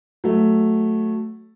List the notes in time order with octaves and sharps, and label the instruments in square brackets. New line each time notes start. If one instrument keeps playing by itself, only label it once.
[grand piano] F#3 A3